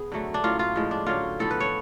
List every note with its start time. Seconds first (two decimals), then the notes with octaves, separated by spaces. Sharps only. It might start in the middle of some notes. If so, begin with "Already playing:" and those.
Already playing: B3 G#4
0.12 D3 F#3 A3
0.34 D4
0.44 A2 F#3 C#4 F4
0.59 F4
0.75 A2 F3 G#3
0.91 D4
1.06 D3 F#3 C#4 F4
1.39 A2 F3 B3 A4
1.51 B4
1.60 C#5